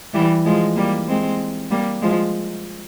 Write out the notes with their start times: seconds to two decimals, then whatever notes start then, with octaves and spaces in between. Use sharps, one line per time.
0.14 E3 G3
0.45 F3 G#3
0.76 G3 A#3
1.08 G#3 C4
1.70 G3 A#3
2.02 F3 G#3